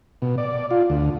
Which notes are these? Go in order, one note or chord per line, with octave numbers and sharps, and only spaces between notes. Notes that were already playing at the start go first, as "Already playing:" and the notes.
B2
D5
F4
D2